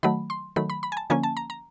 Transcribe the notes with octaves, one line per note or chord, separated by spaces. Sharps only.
D#3 F#3 A3 B5
C6
D#3 F#3 A3 B5
B5
B5
G#5
A5
D3 F3 A#3 C#4 G#5
A5
A#5
A#5